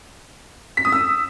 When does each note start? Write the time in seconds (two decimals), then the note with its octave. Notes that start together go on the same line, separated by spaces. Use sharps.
0.77 B6
0.85 D#6
0.92 E6